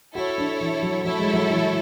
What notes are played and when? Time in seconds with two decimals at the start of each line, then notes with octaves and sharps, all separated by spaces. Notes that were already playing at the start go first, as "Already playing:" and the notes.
0.15 E4 F#4 A4 C#5
0.38 D4
0.61 E3
0.82 F#3
1.05 F#3 A3 E4 A4 C#5 E5
1.19 G#3
1.33 F#3
1.51 E3